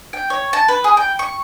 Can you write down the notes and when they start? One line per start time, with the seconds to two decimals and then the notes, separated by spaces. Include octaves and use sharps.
0.13 G5
0.30 C#5
0.53 A5
0.68 B4
0.84 G#4
0.97 G5
1.19 C#6